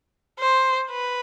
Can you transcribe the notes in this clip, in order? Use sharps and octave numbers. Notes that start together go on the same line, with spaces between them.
C5
B4